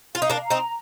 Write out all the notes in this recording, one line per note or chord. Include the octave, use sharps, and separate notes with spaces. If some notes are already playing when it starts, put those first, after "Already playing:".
F4 F5
D#4
A#3 D4
A#5
C4 D#4